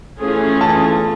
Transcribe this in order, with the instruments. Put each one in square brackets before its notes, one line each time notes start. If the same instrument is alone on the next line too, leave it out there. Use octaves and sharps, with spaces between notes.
[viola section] E3 A3 C#4 F4 G#4
[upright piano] A5